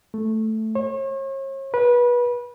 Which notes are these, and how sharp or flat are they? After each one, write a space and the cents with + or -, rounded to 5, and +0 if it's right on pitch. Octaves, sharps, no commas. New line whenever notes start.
A3 +0
C#5 -40
B4 -25